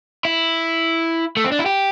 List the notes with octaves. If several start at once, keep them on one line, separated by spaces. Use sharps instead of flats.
E4
A3
C4
D4
E4
G4